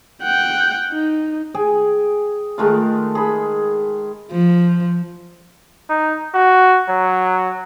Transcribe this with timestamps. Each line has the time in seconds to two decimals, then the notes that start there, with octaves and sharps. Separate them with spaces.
0.22 F#5 G5
0.92 D#4
1.54 G#4 G5 G#5
2.58 D#3 G#3 A3 F4
3.15 G#4 B5
4.31 F3
5.89 D#4
6.35 F#4
6.89 F#3